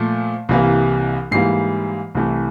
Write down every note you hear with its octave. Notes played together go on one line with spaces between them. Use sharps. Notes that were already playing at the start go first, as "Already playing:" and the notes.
Already playing: A#2 F3 A3
C2 C3 E3 G3 A#3
G#2 E3 G3 A#3 C7
C2 C3 E3 A3